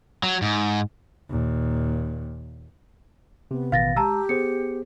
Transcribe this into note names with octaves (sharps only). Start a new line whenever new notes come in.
F#3
G#2
D#2 A#2
C3 B3
A1 B2 D#3 F5 A6 A#6
G#3 G4 A5 A#5 E6
B3 G#4 C5 C#7